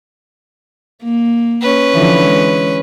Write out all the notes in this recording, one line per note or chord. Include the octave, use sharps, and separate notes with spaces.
A#3
C#4 B4
D3 E3 F3
G#3